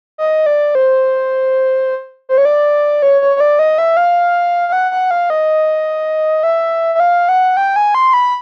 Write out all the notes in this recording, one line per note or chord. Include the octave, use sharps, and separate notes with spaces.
D#5
D5
C5
C5
C#5
D5
C#5
C#5
C#5
D5
D#5
E5
F5
F5
F#5
F#5
F5
D#5
E5
E5
F5
F#5
G5
G#5
C6
B5